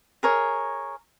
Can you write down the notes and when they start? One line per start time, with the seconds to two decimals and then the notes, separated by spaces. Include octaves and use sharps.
0.23 G#4 A#4 C#5